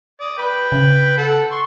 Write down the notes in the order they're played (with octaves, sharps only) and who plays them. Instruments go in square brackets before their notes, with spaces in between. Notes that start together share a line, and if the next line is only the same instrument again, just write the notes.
[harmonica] D5 D#6
B4 G5 B5
[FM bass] C#3
[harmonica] A4 F#5
C6 C#6